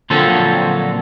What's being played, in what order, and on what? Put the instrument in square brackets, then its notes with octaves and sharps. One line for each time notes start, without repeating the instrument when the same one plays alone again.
[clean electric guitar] A#2 D3 F3 F#3 C4 A4